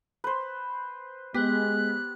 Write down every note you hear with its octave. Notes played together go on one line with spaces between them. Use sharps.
B4 C5
G#3 B3 G4 F#6